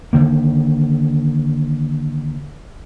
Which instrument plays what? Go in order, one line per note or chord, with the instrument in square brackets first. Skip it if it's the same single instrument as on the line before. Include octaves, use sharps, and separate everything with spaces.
[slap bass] D3 D#3 A#3